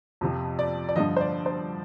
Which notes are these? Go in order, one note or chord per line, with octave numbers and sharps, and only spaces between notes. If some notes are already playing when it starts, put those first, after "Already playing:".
F2 C3 F3
D5
D5
G2 D3 F3 D#5
C5
D5
C5